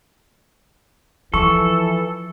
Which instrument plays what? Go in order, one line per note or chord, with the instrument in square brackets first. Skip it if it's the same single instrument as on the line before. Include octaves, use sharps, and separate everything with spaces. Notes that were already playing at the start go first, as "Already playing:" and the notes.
[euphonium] E3 [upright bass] F3 [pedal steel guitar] A4 [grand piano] C#6